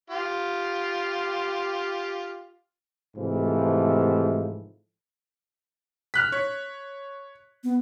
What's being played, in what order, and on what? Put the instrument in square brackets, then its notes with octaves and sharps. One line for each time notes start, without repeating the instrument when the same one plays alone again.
[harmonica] F4 G4
[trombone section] G#2 C3 E3 F3 A3
[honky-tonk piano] F6 F#6 B6
C#5
[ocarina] B3